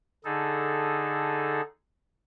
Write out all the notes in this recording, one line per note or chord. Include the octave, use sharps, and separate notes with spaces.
D3 D#4 G#4 A4